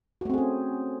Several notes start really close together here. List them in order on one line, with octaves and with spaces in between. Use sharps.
F#4 A3 C4 G#4 C#4